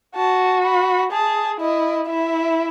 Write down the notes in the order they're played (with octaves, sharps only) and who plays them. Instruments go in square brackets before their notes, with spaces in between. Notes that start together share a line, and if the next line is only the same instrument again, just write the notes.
[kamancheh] F#4 [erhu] A5
[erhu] B5
[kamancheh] G#4 [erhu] A5
[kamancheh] E4 [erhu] D#5
[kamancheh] E4 [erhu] E5